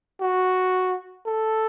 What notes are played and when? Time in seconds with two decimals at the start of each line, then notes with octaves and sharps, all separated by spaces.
0.21 F#4
1.26 A4